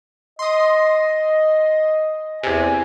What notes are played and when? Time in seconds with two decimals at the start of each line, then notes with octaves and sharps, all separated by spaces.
0.39 D#5 C6 D#6
2.43 E2 C3 G#5